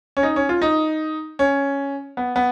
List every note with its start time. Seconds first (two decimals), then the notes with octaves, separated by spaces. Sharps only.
0.17 C#4
0.23 D#4
0.36 C#4
0.49 F4
0.62 D#4
1.39 C#4
2.17 B3
2.36 B3